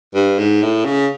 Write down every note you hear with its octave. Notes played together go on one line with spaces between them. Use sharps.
G2
G#2
A2
C#3